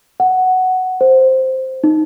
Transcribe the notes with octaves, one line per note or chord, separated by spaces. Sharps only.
F#5
C5
D#4